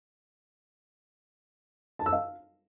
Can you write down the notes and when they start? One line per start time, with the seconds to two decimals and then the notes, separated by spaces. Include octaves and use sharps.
1.99 A5
2.06 E6
2.13 F5